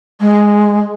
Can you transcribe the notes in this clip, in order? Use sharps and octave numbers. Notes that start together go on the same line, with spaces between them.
G#3